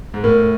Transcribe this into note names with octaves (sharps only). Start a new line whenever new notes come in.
G#2
A2 A#4